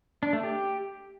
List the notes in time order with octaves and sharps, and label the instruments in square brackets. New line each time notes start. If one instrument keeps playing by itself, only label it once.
[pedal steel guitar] D4
A3
G4